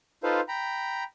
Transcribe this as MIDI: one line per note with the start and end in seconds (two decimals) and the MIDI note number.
0.23 0.41 63
0.23 0.41 65
0.23 0.41 69
0.23 0.41 71
0.23 0.41 72
0.23 0.41 77
0.48 1.04 79
0.48 1.04 82
0.48 1.04 83